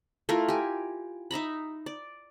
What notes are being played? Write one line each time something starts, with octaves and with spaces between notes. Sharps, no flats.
A3 E4 F4 A#4
G4 G#5
D#4 E5 A#5 B5
D5